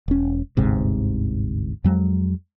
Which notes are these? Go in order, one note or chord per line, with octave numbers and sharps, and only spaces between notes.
E1 C#4
G1 D2 G#2 C3
F2 F#3 G#3